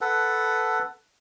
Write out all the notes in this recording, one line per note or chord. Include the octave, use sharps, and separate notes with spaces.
A4 B4 F#5